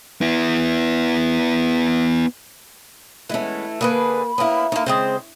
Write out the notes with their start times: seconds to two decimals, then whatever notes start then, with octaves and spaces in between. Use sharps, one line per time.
0.21 B3 E4
3.30 E3 G#3 A3 B3 C#4
3.81 D3 A#3 G#4 B4 B5
4.38 A#3 B3 C#4 E4
4.72 A3 A#3 D#4 A#4
4.86 C#3 G#3 C4 C5